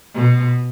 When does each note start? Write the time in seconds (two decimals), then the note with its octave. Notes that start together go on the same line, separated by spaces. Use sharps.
0.14 B2